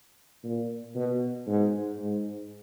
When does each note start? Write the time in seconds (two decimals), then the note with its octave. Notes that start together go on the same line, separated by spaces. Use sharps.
0.44 A#2
0.96 B2
1.48 G#2
2.00 G#2